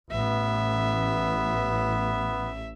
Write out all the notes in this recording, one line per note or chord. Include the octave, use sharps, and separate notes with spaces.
A1 B3 E5